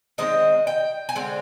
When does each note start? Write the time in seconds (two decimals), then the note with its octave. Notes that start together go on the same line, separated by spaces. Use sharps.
0.18 D#3 G#3 C4 D#5
0.67 G5
1.09 G#5
1.15 D3 G#3 C4 G5